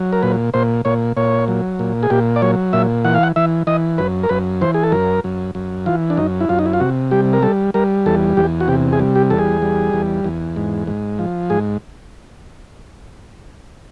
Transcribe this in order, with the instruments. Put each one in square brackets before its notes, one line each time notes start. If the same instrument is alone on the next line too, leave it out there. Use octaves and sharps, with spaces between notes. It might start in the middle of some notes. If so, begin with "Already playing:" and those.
Already playing: [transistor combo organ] F#3
A#4
A#2 B4
A#2 C5
A#2 C#5
A#2 C#5
F#3
A#2
G#4
A#2 G4
D5
F#3 C#5
A#2 E5
E3 F#5
F5
F#5
E3 E5
E3 D#5
F#2 B4
A#4
F#2 B4
E3 C5
G#4
A4
F#2 A#4
F#2
F#2
E3 F4
D4
F#2 D#4
E4
F#2 F4
D#4
E4
F4
C3 F#4
G3 G4
A#4
G3 A4
G3 A#4
E2 A4
E2 G4
F#4
C3 G4
G#4
G3
G4
E2 A4
G#4
G3
E2
E2
G#2
G#2
F3
G#2 G#4